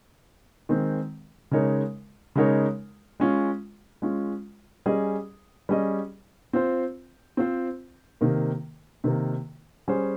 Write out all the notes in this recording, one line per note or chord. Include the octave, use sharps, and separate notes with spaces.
D#3 G#3 C4
C#3 G#3 D#4 A#4 C#5
C#3 G#3 D#4 A#4 C#5
G#3 C#4 F4
G#3 C#4 F4
G3 C#4 G#4 D#5
G3 C#4 G#4 D#5
C4 F4 C5
C4 F4 C5
C3 D#3 A#3
C3 D#3 A#3
G3 C#4 G#4 C5